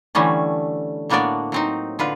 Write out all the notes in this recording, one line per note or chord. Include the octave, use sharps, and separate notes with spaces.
D3 E3 G3 A3 C#4
A2 A#3 B3 D4 F#4 D5
F#3 C4 D#4
D3 F4 B4